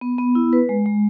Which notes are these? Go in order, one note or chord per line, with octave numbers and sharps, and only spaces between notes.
B3
B3
E4
B4
G#3
G#3